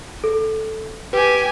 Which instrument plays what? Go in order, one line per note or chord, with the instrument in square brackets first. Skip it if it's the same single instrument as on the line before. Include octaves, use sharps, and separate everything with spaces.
[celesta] A4
[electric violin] G4 G#5 [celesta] B4